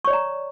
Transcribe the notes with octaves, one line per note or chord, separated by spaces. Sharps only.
C#5 D5 A#5 C#6